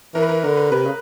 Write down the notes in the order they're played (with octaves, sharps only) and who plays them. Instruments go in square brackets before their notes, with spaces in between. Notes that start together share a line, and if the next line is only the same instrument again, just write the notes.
[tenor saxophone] E3 [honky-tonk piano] A#4
[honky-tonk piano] B4
A#4
[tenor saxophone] D3 [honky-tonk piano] A#4
[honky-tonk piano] B4
[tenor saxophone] C3 [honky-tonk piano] B4
[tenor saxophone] C#3